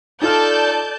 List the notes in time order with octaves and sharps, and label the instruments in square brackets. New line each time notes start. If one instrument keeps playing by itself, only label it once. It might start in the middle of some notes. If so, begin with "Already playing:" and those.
[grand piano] D#4 F4 F6 [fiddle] A4 [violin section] D5 A5 G6